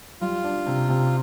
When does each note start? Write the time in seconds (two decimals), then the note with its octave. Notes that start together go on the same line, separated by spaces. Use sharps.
0.21 G3 F4
0.44 D4
0.66 C3
0.89 C3